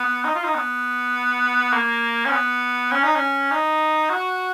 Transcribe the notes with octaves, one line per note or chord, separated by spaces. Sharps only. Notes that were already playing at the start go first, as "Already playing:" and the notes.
Already playing: B3
D#4
F4
D#4
B3
A#3
C#4
B3
C#4
D#4
C#4
D#4
F#4